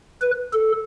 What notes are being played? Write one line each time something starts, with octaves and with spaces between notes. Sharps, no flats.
B4
A4